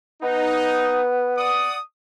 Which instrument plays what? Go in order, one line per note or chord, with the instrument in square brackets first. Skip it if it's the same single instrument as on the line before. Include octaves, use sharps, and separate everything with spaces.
[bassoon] B3 [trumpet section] D#4
[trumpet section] D5 F#5 D#6